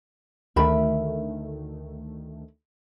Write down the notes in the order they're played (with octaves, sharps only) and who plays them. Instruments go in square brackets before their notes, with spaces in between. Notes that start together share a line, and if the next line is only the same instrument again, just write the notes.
[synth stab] D2 D#3 A3 [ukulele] A#4 E5 B5